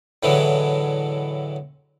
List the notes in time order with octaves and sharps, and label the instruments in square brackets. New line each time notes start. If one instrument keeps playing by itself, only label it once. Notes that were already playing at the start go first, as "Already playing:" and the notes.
[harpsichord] A2 D3 E3 F#3 G#3